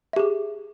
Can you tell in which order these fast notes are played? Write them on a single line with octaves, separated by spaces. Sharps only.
E5 G4 G#4